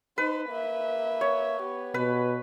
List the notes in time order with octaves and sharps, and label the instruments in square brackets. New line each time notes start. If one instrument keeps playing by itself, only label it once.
[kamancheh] D#4 C5 [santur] B4
[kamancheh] A#3 E5
[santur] C#5
[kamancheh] B3 G4
[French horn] B2 [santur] B4